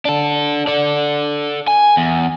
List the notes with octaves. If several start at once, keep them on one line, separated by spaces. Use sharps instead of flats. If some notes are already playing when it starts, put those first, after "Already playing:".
D4 A4
A4 D5
G#5
E2